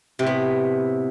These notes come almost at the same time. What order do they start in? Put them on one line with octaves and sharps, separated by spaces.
C3 A2 B3